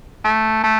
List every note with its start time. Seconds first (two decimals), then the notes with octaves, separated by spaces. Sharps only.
0.25 A3
0.64 A3